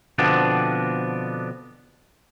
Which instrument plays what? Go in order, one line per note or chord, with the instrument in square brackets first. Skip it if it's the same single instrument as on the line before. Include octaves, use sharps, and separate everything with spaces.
[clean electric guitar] B2 D3 F3 B3 C4 D4